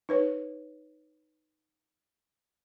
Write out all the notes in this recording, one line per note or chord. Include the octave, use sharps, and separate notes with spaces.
D#4 B4 C#5